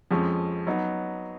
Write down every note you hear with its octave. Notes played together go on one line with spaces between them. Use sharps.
F2 F3 G#3 C#4
F#3 B3 D#4